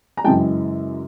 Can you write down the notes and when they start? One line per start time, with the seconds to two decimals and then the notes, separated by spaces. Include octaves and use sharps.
0.17 A#5
0.24 F#2 C#3 E3 G#3 G5 A5